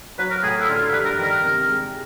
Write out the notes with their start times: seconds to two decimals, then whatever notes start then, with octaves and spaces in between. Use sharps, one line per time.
0.19 F#3 B4
0.31 A#4
0.43 A2 G#4
0.60 E4
0.69 D3 F4
0.81 F4
0.93 G2 B4
1.05 A#4
1.18 D#3 A#4
1.43 C3
1.68 G#3